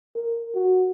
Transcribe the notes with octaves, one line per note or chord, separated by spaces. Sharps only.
A#4
F#4